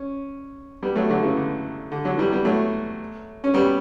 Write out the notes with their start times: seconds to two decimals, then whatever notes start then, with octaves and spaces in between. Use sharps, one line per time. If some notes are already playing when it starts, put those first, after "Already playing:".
Already playing: C#4
0.83 G3 B3
0.96 F#3 A3
1.10 D3 F#3
1.23 C#3 E3
1.37 D3
1.92 D3
2.05 D3 F#3
2.18 E3 G3
2.32 G3 B3
2.45 F#3 A3
3.44 C#4
3.54 G3 B3